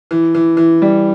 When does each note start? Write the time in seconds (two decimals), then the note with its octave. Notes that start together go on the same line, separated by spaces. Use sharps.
0.11 E3
0.35 E3
0.57 E3
0.82 G3